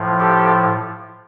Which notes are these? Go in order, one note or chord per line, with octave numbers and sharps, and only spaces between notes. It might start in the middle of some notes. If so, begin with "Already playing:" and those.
Already playing: A2 F3
G4 A4